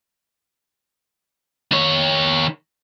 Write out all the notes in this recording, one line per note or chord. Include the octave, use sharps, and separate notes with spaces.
D#3 C#5